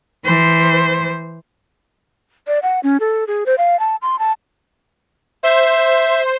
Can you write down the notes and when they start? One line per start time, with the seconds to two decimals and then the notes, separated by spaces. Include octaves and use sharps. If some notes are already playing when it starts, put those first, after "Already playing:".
0.25 E3 C5
2.47 D5
2.63 F#5
2.83 C#4
3.00 A4
3.28 G#4
3.46 C5
3.58 F5
3.80 A5
4.02 C6
4.19 A5
5.43 C5 E5